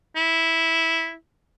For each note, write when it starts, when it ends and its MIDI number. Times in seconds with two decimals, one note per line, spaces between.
0.16 1.14 64